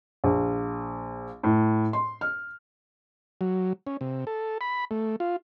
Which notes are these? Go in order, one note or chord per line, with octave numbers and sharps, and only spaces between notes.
A#1
A2
C6
F6
F#3
C#4
C3
A4
B5
A3
F4